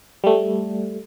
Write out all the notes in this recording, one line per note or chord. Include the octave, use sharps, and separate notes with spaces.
G3 A3